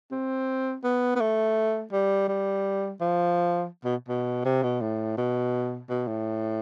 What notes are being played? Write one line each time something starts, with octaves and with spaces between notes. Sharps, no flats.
C4
B3
B3
A3
G3
G3
F3
B2
B2
C3
B2
A2
B2
B2
A2